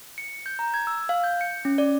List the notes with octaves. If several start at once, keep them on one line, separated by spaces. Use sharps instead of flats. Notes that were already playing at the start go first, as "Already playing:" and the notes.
C#7
G6
A#5
G#6
E6
F5
G6
C#7
C#4
D5